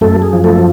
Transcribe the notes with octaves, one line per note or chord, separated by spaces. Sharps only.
F#2 A3 A4
G#4
F3
A3 A4